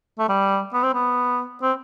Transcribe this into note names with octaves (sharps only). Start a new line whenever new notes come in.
A3
G3
B3
C4
B3
C4